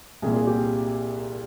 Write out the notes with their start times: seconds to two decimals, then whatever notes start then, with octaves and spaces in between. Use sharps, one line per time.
0.22 C2 G#4
0.26 A#2
0.35 G#4
0.47 G4